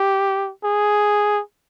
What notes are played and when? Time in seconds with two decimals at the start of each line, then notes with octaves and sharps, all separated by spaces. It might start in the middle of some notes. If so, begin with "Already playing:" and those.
Already playing: G4
0.64 G#4